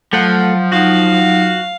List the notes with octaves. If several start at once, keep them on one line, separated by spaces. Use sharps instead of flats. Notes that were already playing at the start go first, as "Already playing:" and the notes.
F3 F#3 A3 A4 F5 F#5
F#3 D#4 F4 F#4 F5